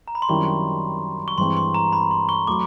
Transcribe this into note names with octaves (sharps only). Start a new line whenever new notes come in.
A#5
B5
C6
F#2 D#3 G3 C4 E4 C#6
C#6
G2 E3 G#3 C4 C6
C6
A#5
B5
C6
C#6
F#3 A3 D6